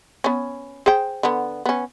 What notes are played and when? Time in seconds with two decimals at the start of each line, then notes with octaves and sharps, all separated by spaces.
0.24 B3 C#4
0.86 G#4 C5 G5
1.23 D3 B3
1.66 B3 C#4